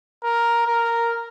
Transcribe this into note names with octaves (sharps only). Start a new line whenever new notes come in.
A#4
A#4